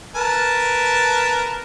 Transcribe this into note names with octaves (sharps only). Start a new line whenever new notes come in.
A#4 B4 A5